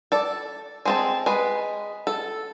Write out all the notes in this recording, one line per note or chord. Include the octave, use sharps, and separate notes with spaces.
A4 D5
G#3 C4 A5
G#3 B4
A4